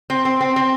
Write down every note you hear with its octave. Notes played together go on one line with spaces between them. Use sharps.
C4
C4
C4
C4